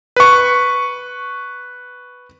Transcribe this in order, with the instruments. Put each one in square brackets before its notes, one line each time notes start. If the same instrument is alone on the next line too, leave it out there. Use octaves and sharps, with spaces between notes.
[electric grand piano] B4 C#6